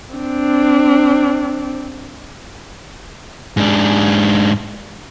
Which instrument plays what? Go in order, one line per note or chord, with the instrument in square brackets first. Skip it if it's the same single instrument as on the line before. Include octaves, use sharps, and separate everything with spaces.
[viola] C4 D4
[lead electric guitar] G#2 D4